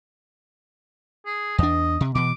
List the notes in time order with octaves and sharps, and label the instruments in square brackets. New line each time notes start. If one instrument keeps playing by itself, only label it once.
[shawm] G#4
[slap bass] E2 D4 [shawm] D#5
[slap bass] C3
[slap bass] B2 E3 [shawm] D6